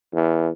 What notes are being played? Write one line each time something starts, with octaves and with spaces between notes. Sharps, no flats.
E2